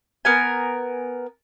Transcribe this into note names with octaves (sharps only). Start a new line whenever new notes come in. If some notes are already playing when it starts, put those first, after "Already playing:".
B3 A#4 G#5